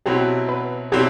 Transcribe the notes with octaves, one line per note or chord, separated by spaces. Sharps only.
B2 F#3 C4 E4 G4
B4
B2 F#3 C4 E4 G4